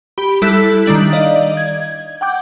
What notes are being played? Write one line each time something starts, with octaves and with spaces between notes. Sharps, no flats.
G4 B5 D7
G3 E4 A4 E6 F#6 B6
D#3 G3 D4 F#7
D5 D#5 F5
G#6
F#5 G5 D6 G6